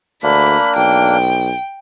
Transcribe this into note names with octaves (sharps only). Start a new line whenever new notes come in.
D2 A#3 D4 B5
B1 G5